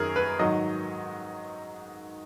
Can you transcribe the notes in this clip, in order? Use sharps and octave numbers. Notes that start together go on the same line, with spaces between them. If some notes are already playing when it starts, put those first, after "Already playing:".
Already playing: F#2 D#3 F#3 G#4 A#4
B4
G#2 D#3 F#3 D#5